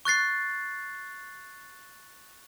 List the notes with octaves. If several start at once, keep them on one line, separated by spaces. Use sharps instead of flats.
C#6 F#6 A6 C7